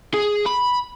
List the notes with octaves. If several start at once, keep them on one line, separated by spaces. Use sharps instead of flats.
G#4
B5